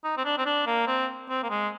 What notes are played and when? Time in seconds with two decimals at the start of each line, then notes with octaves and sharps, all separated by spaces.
0.04 D#4
0.17 C4
0.25 D4
0.38 C4
0.46 D4
0.66 A#3
0.87 C4
1.29 C4
1.43 A#3
1.50 G#3